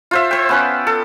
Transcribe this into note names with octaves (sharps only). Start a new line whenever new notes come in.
F4 C5 E5
C5 G5
B3 C#4 B4
A4